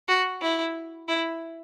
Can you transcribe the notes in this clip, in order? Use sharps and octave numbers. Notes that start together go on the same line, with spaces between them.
F#4
E4
E4